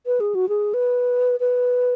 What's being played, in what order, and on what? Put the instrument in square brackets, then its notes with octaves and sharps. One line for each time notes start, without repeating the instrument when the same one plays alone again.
[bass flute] B4
G#4
F#4
G#4
B4
B4